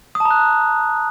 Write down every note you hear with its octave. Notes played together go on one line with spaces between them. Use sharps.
D#6
A5
A#5
F#6